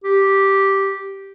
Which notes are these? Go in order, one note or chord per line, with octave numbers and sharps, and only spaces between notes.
G4